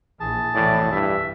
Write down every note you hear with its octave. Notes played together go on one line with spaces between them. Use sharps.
A#1 E3 G#4 A5
B1 F2 A2 E3 D5
G2 E5